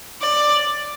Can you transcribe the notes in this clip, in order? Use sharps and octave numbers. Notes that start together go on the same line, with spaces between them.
D5